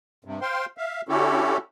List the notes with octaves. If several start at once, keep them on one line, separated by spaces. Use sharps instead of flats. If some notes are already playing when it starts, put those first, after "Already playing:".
G2 C3
C5 F5 G5 C6
E5 F5
D3 C#4 E4 F#4 G4 A4